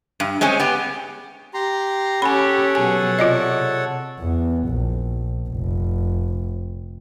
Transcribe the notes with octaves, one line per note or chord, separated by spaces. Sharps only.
G2
G#3 C4 C#4 G#4
B3 G4
G4 A#5 C6
C#4 G4 A4 C#5 F#5 G#5 B5
B2 F#3 G#4 G#5
C3 F4 D5 D#5
E2
A#1
F1